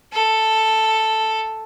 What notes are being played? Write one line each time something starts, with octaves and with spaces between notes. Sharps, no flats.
A4